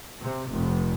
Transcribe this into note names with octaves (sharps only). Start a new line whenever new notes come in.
C3
F1